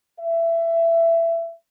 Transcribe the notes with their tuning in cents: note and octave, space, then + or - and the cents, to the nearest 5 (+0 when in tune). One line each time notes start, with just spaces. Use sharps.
E5 +20